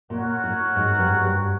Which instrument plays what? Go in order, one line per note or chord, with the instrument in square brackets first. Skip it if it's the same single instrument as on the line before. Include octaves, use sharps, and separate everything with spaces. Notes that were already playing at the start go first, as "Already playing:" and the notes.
[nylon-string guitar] A#2 [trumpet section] F#4 A#4 C#5 F#5
[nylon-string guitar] A2
G#2
G2
G#2
G2